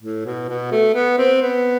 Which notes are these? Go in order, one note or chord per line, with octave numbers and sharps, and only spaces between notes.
A2
B2
B2
A3
B3
C4
B3